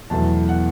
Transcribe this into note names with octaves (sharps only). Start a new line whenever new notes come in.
E2 B2 F#3 A3 E4 A5
F#5